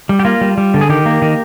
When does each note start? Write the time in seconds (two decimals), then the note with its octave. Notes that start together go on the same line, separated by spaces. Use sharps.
0.09 G3
0.19 G4
0.25 A#3 F4
0.41 G3
0.58 G3
0.74 D3
0.81 G#4
0.89 D#3 G4
1.06 A#3
1.22 D#3